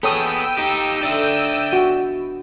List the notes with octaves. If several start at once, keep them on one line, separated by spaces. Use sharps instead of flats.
B3 G#4 A4 C#5 G5 D#6 E6 D#7
D#4 G4
D3 D#4 D5 E5
B3 F#4